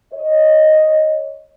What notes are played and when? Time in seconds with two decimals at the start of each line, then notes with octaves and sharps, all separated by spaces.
0.13 C#5 D#5